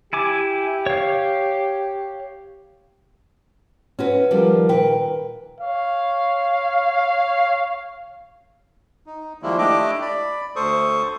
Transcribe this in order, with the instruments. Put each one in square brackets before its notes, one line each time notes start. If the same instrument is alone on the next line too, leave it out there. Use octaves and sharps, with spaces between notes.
[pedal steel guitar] E4 G#5 D6 [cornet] G4
[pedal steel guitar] C#5 F5
[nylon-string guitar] C#4 F#4 B4
[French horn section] D#3 A#4 [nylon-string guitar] F3 G3 D5
[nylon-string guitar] A#2 B4 G5
[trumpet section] C#5 F5
[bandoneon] D#4
D#3 F3 G3 G#3 A#3 E4
A3 D4 E4 G4 D#5 D6
D5 B5
D2 A4 C5 C#6 D#6